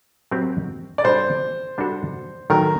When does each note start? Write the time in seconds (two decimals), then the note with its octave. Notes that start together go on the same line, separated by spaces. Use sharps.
0.31 F#3 C4 G4 A#4
0.98 D5
1.04 G3 D4 F#4 A4 C5
1.78 G3 D4 F#4 A4
2.50 D#3 F#3 A3 A#4